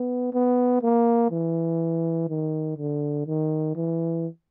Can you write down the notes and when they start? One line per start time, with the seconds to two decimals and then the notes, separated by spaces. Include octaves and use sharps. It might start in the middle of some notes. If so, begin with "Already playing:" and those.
Already playing: B3
0.33 B3
0.82 A#3
1.31 E3
2.29 D#3
2.78 D3
3.27 D#3
3.76 E3